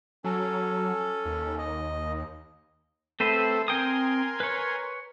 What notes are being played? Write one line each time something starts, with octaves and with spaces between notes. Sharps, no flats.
F#3 C#4 A4
D#2
D#5
A3 C4 A4 B4 C5
C4 A#4 G5 G#5 C6 D#6
B4 C#5